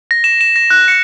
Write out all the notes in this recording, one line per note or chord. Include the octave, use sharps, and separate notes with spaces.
A#6
E7
E7
A#6
F#6
C#7